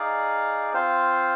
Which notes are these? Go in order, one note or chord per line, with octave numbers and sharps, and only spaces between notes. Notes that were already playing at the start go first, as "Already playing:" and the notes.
Already playing: D#4 G#4 D5 F5
C4 F4 C5 F5